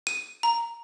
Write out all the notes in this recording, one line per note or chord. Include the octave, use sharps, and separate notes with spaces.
D#7
A#5